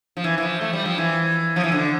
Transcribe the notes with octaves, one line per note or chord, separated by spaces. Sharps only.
F3
E3
E3
F3
A3
G3
F3
E3
F3
E3
D3